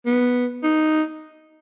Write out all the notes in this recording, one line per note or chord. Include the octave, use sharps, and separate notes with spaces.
B3
D#4